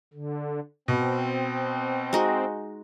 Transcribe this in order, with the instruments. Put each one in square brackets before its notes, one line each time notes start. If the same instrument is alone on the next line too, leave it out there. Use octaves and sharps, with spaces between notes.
[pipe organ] D3
[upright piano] B2 [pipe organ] C4
[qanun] G#3 D#4 F#4